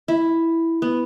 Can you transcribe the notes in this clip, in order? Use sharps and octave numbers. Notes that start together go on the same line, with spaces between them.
E4
B3